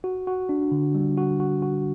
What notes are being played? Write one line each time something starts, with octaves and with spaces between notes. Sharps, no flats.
F#4
F#4
D4
D3
G3
F#4
F#4
F#4